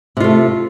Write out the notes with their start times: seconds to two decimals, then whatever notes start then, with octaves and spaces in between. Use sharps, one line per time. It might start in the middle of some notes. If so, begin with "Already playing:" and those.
0.17 C3
0.20 F4
0.24 A3